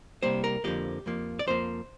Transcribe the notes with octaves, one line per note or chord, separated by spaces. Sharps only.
C2 C3 G3 A#3 C5
A#4
F2 D3 F3 A#3 G4
F2 F3 A#3
D5
F2 F3 A#3 C5